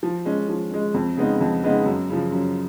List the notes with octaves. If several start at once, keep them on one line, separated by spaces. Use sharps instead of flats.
F3
G#3 C#4
F3
G#3 C#4
F2
C#3 G#3 B3 D#4
F2
C#3 G#3 B3 D#4
F#2
C#3 F3
F#2